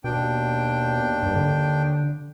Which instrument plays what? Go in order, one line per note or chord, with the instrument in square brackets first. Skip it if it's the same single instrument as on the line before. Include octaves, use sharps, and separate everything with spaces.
[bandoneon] D#2 D4 G5 [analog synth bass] B2
[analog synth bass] G2
D3